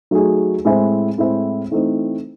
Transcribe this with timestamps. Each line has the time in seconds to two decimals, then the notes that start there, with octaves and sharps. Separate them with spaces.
0.11 F#3 A3 D#4 G#4
0.65 A2 G#3 C4 E4 C5
1.18 A2 G#3 C4 E4 C5
1.71 E3 A3 C4 D#4